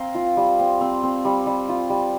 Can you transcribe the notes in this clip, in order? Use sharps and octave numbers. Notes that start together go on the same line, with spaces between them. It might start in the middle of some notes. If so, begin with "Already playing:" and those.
Already playing: C4 F5 A#5 C6
F4
G3
C4
C4
C4
G3
G3
F4
G3